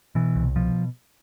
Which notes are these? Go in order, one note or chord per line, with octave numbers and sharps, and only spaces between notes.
B2 E3
C2
B2 F3